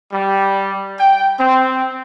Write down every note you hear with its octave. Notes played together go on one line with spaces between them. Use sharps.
G3
G5
C4